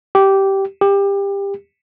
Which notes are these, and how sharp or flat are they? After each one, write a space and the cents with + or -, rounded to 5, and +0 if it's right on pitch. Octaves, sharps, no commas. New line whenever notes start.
G4 -10
G4 +25